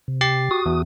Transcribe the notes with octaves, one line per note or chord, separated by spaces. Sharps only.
C3
G4 A6 C7
F#4 D#6
E2